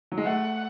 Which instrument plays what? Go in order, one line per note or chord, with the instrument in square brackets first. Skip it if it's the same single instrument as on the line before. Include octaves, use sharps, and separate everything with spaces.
[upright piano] F#3
G#3
[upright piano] A3 [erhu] F#5